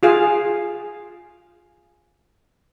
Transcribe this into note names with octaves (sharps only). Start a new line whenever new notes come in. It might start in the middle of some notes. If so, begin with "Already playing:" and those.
F4 G#4 F5